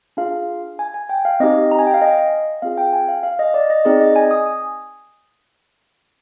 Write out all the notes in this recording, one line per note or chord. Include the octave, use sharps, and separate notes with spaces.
D4 F4 G#4 F5
G#5
G#5
G5
F5
C4 D#4 G4 D#5
A#5
G#5
G5
F5
D#5
C4 F4 G#4 F5
G5
G#5
F5
F5
D#5
D5
D#5
C4 D#4 G#4 D5
D#5
G#5
D#6